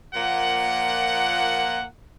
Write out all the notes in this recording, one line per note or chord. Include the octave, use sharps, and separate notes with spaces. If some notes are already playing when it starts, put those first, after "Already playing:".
A#2 F3 A#3 F#5